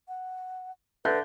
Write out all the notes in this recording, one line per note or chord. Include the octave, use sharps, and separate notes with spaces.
F#5
D3 B4 E5 F#6 G6